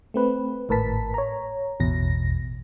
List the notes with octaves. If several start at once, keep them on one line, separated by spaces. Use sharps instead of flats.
A3 C4 B4
G#1 A2 A#4 B4 A5 B6
C#5 A#5
A1 E2 B2 A#6